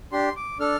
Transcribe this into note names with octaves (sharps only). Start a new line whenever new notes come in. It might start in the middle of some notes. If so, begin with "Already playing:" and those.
D4 G4 C6
D6
D4 A4 F6